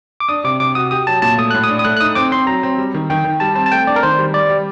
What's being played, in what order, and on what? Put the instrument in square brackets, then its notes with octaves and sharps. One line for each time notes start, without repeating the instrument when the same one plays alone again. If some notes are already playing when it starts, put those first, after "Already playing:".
[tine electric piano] D6
[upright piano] D4 [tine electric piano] D#6
[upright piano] C3 [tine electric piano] D6
[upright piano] C3 [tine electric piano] D6
[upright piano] F#4 [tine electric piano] D#6
[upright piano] G4 [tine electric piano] D#6
[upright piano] F#3 [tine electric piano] A5
[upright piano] A#2 [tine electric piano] A5
[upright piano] A3 [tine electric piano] D#6
[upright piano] A2 [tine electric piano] F#6
[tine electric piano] D#6
[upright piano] D4
[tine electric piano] D#6
[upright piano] A3 [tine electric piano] F#6
[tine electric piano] F#6
[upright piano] D#4 [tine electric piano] D#6
[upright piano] C4 [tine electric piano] D6
[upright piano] C4 [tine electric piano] C6
[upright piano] F#3 [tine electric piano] A#5
[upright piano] C4
G3
D#3
[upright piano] D#3 [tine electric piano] G5
[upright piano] D#3
[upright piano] G3 [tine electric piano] A5
[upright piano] C4 [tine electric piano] A5
[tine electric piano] A5
[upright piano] A3 [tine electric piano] G5
[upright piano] D4 [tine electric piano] D5
[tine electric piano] A#4
[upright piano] D#3 [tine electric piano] C5
[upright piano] G3
[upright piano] G3 [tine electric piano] D5
[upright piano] G3